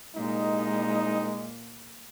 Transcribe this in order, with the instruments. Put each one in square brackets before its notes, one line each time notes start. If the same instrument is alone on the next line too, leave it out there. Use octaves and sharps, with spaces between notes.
[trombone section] C2 D#4 [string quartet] A#2 [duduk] G#3